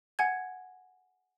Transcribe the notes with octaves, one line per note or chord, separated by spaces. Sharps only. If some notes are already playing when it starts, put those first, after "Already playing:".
F#5 G#5 G#6